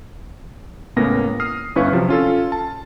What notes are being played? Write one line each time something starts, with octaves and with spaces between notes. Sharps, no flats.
C#2 A2 A#3 B3 C#4 A#6
D#6 F6 C7
G1 C#4 E4 B4 F5 C#6
C3 F3 F#3
C#4 F4 A4
A5